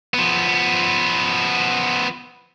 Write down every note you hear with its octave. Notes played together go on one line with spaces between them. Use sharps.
F3 B3